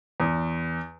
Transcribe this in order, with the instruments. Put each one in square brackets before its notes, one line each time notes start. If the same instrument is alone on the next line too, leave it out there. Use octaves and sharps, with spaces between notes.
[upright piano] E2